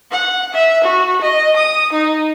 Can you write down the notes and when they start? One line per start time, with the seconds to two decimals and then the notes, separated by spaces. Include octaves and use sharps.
0.12 F#5
0.54 E5
0.84 F#4
1.22 D#5
1.57 D#6
1.92 D#4